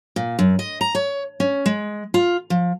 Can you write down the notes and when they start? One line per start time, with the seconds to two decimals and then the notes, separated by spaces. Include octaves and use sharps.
0.16 A#2
0.39 F#2
0.59 D#5
0.81 A#5
0.95 C#5
1.40 C#4
1.66 G#3
2.14 F4
2.50 F3